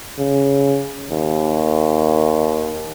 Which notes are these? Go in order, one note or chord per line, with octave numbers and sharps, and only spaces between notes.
C#3
D#2